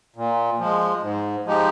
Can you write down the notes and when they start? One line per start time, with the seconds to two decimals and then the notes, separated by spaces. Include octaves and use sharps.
0.16 A#2
0.59 F3 G#3
1.02 G#2
1.45 F3 G#3 D#4 G4